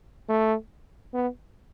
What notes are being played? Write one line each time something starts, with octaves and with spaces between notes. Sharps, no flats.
A3
B3